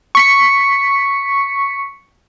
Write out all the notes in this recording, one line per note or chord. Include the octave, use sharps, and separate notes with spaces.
C#6 B6 C#7